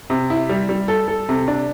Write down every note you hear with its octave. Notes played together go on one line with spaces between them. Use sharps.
C3
E4
G3
G3
A4
A4
C3
D4